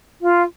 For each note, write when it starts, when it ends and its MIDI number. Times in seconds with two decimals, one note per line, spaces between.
0.20 0.43 65